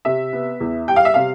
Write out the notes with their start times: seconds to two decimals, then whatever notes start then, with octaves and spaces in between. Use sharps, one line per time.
0.05 C3 E5
0.33 B3
0.60 E2
0.88 G3 G5
0.96 F5
1.05 E5
1.14 C3 F5